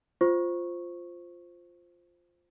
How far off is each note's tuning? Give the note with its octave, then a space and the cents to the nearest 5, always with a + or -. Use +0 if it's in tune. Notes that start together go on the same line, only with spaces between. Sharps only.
F4 +0 C5 +0 C#6 -10